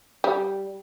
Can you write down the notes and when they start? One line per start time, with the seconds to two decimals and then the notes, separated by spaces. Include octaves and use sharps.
0.24 G3